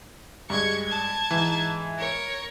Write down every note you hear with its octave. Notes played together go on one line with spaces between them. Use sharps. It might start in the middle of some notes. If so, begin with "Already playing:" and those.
G2 G#3 C#6 G#6
A5 G#6
G#2 E3
A#4 C#5